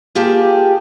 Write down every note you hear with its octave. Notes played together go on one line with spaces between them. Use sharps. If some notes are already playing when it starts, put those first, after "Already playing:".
A#3 F4 G4 G#4 G5 A5